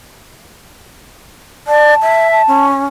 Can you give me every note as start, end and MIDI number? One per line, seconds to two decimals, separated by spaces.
1.68 1.94 74
1.68 2.28 81
2.02 2.42 76
2.32 2.66 81
2.48 2.87 61